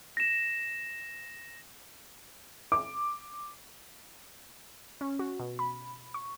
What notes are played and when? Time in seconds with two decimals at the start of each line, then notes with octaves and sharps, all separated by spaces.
0.17 A#6 E7
2.72 D6
5.01 C#4
5.19 F#4
5.40 B2
5.59 B5
6.14 C#6